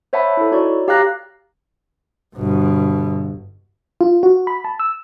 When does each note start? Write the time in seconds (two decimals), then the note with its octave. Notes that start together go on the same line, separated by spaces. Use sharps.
0.13 C5 C#5 E5 F#5 A5 B5
0.37 E4 A4
0.52 D#4 F#4 C#5 D5
0.88 G4 F5 A#5 F#6 A#6
2.35 G1 B2
4.01 F4
4.23 F#4
4.47 B5
4.65 A5
4.80 E6